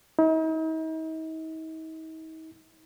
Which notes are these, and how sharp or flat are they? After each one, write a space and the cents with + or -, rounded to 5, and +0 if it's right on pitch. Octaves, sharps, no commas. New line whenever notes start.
D#4 +45